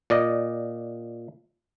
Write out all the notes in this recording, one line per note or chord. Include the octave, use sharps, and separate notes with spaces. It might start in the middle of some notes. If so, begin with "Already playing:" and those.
A#2 D5 D#5